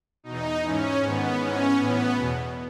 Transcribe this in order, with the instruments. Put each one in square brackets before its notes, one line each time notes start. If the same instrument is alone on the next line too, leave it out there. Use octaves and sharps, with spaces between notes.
[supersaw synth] B2 D#4
E2
G#2 E3 C#4
G#2 D#3 B3
G#2 E3 C#4
A2 E3 B3
E2 B2